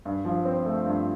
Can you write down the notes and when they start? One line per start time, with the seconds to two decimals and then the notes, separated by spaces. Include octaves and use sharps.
0.05 G2
0.25 F3
0.45 C4
0.66 A3
0.86 G2